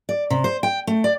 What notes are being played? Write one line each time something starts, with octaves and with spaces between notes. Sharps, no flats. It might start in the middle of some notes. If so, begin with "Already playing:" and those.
D5
C3
C5
G5
A3
D5